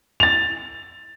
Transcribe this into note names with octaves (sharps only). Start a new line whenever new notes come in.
A6 F7